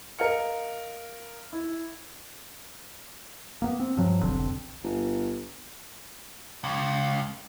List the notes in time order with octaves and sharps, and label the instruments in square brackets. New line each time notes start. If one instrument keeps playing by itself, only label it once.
[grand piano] A#4 D#5 F5 F6 C#7
E4
[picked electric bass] A#3 B3
C4
G2 F3 F#3
F1 B1 D3 C4
[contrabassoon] G1
[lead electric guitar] C#2